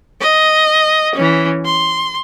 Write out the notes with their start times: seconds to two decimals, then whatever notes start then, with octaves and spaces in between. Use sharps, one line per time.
0.21 D#5
1.15 E3 C#4
1.65 C6